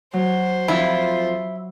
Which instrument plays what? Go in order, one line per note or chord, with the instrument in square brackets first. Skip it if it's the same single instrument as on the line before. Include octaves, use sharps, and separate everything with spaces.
[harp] F#3 [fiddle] C5
[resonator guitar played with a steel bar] F2 F3 F4 [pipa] E4